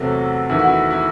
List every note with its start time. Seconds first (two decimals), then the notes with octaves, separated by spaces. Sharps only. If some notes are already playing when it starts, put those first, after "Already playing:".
Already playing: E2 C3 F#3 A3 F#4 A4
0.49 E2 D#3 A3 E4
0.59 F#4
0.67 E4
0.91 E4